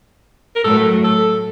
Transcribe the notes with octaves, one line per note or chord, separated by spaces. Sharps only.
A#4
A2 F#3 A3 A4
A4